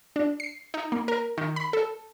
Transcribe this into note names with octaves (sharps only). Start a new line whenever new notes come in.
D4
C7
D#4
A#3
A#4
D#3
B5
A4